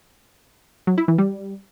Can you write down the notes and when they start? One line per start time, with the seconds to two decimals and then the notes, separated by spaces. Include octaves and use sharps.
0.87 F#3
0.98 E4
1.08 E3
1.18 G3